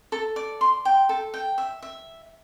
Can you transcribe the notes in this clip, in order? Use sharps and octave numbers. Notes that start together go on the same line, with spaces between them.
A4
D5
C6
G5
A4
G5
E5
E5